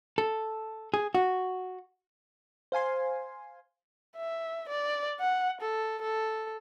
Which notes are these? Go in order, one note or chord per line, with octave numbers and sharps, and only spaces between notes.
A4
G#4
F#4
C5 F5 G#5 C6
E5
D5
F#5
A4
A4